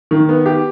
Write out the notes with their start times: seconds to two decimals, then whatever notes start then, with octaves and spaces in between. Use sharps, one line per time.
0.11 D#3
0.29 B3
0.46 G4